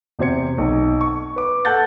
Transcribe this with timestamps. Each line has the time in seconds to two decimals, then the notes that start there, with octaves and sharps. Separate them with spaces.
0.19 E2 C3 F#4 C5 G#6 C#7
0.58 B1
1.01 C#6
1.36 B4 D6
1.65 A4 F#5 A5 F#6 G6 A6